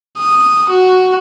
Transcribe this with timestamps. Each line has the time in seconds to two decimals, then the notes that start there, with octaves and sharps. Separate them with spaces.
0.17 D#6
0.70 F#4